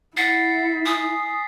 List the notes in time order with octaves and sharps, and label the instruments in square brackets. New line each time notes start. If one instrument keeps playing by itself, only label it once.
[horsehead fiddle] E4 [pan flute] F#5 [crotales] A6 B6 C7
[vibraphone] G#5 [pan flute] D#6